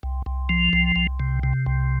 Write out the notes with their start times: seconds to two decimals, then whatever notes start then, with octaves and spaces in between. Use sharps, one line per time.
0.03 C2
0.26 C2
0.49 F3
0.73 C2
0.96 C2
1.20 C3
1.43 C3
1.66 C2